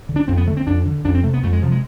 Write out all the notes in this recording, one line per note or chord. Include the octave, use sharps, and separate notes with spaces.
D3
D4
F2 C4
B3
D3 A3
C4
F2 D4
D3
F2 D4
C4
C3 A3
B3
F2 A3
G#3
C3 F3
G#3